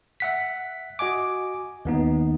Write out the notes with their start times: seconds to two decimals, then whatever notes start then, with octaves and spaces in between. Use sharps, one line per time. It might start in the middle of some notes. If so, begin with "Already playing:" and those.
0.20 E5 F#5 B6
0.99 F#4 D#5 G#5 D6
1.85 D#2 B3 D#4